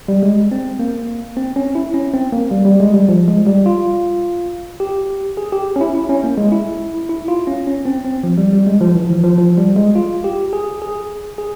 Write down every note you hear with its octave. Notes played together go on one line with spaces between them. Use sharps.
G3
G#3
C4
A#3
C4
C#4
E4
C#4
C4
A#3
G3
G3
G#3
G3
F3
G#3
G3
F4
G4
G#4
G4
C#4
E4
E4
C#4
A#3
G#3
E4
E4
F4
C#4
C#4
C4
C4
F3
G3
G3
G#3
F3
E3
F3
F3
F3
G3
G#3
F4
G4
G#4
G#4
G#4